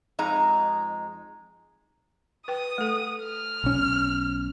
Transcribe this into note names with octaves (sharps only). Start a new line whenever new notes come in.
F2 G#3 D#4 A#5
B4 G5 D#6
A3 A4
F6
B1 C#4